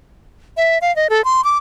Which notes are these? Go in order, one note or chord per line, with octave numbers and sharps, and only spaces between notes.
E5
F5
D#5
A4
C6
D6